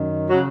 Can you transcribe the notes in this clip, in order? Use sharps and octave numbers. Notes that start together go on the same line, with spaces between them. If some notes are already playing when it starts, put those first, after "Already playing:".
Already playing: F#2 D#3
C#3 F#3